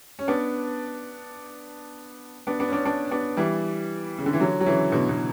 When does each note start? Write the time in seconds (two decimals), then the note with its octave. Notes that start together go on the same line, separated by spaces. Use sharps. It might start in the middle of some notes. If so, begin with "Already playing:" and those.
0.19 C#4
0.28 B3 D4
2.47 B3 D4
2.60 B3 D4
2.68 C#4
2.72 B3 D4
2.85 B3 D4
3.11 B3 D4
3.37 E3 G3
4.18 C#3
4.26 D3
4.33 E3
4.40 D3 F#3
4.61 F#3
4.66 C#3 E3
4.92 B2 D3
5.09 B2